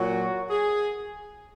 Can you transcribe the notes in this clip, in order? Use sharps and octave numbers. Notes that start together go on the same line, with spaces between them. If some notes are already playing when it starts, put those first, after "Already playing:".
Already playing: A#2 F#3 F#4
G#4